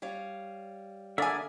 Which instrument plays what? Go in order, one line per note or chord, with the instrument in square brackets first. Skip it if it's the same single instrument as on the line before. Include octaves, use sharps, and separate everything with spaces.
[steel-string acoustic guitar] G3 C#5 F5
[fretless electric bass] D3 [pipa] A#3 G#5 [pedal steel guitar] G#4 D5 E5